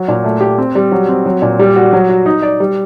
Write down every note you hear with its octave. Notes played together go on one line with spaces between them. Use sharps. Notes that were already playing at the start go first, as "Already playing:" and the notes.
Already playing: F#3
A#2
A3
G4
C4
G3
F#3
C4
F#3
A#2
G3
F#4
F#3
F#4
D#4
D5
G3